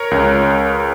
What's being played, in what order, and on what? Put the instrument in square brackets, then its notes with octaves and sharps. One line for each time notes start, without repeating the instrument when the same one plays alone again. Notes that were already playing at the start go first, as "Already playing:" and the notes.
Already playing: [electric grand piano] A#4 C#5
C#2